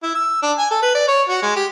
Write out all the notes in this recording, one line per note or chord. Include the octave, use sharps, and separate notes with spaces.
E4
E6
D4
G#5
A4
B4
D5
C#5
F#4
G#3
G4